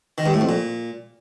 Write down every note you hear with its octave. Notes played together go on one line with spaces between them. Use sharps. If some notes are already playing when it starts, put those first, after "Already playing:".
D#3
G2
A2
F2
A#2